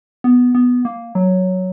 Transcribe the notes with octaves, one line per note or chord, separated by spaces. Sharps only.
B3
B3
A#3
F#3